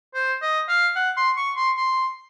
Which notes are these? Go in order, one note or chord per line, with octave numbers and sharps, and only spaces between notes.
C5
D#5
F5
F#5
C6
C#6
C6
C6